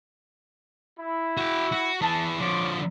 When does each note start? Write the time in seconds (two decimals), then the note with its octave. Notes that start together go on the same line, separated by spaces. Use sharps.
0.99 E4
1.37 F#4 G5
1.72 F#4
2.02 E3 G#4 A5
2.40 D3 F3 C#5 C6 D6